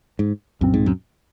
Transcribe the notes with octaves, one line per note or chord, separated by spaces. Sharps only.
G#2
C2 F#2 A#2 F3 C4
G#2
F#2